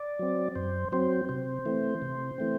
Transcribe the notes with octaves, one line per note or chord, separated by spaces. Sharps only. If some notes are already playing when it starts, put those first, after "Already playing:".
Already playing: D5
F#3 C4
F#2 C5
F#3 C4 C5
C3 C5
E3 A3 C4
C3
E3 A3 C4